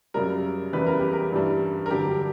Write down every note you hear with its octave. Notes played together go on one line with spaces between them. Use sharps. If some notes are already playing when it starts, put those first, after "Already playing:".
F#2 C#3 G3 A#4
E2 C#3 E3 G3 B4
A#4
G4
A#4
G2 E3 G3
A#4
G2 D3 F#3 G4